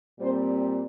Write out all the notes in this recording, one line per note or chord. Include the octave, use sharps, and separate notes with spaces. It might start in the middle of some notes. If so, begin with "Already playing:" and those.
A#2 G3 C4 C5